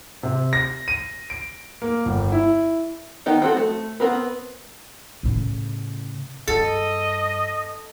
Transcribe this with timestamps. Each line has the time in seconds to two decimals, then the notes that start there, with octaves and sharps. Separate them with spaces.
0.23 C3
0.53 A#6
0.88 D#7
1.30 D7
1.82 A#3
2.05 G1
2.32 E4
3.26 D#3 B3 D#4
3.42 C4 F#4 A4
3.57 A3
4.00 B3 C4 A#4 B4
5.23 A2 C#3
6.47 G2 A4 D#5